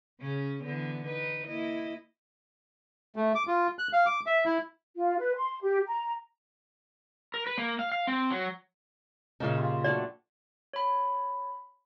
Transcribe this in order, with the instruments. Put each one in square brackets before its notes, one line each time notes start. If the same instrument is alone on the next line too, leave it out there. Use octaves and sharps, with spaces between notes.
[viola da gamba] C#3 C#4
D3 E3 B3
D#4 B4
A#3 E4 D#5
[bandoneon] A3
D6
F4
F#6
F5
D6
E5
E4
[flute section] F4
B4
C6
G4
A#5
[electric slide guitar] A#4
B4
A#3
F5
F5
C4
F#3
[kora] A#2 C#4 D#4 [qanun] C#3 E5 C6
[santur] G3 F4 C5
[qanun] F#3 A3 D4 [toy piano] D5
[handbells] C#5 B5